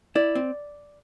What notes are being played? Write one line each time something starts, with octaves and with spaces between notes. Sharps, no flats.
E4 D5
C4